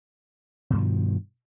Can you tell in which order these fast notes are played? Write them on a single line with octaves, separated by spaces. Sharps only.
B2 G2 D#3 F3